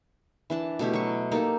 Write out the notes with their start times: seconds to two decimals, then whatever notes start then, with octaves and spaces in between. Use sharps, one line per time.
0.50 E3 D4 A5
0.79 B2 A3 E4 G4
0.94 F#3 C#6
1.31 A#3 D#4 G4 A4